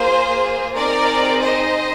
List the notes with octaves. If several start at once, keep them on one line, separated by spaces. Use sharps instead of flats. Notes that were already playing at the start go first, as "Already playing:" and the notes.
Already playing: A#3 F4 G#4 C5
C4 D#4 G#4 A#4 D5
C5 D#5